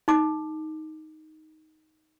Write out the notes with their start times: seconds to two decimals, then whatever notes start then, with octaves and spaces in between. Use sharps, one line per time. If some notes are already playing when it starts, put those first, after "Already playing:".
0.08 D#4 D6